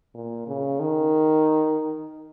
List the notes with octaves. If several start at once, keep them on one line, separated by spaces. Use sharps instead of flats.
A#2
C#3
D#3